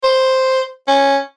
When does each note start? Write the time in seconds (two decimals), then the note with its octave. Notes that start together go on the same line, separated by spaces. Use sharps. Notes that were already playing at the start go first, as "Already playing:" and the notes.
0.03 C5
0.88 C#4